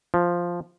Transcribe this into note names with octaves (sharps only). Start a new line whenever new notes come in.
F3